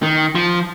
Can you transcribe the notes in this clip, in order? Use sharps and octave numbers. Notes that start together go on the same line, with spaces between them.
D#3
F3